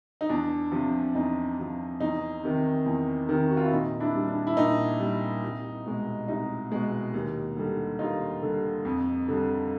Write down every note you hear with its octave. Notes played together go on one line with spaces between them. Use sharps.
D#4
E2 D4
C3 F3
E2 D#4
C3 F3
E2 D#4
C3 D#3
E2
C3 D#3
F#4
F4
E4
A#2 D#4
D4 E4
G3
D4
E4
A#2 D#4
G3
C2
B2 G#3
C2 D#4
B2 G#3
D#2
D3 G3
D#2 D#4 F4
D3 G3
F2
D3 G3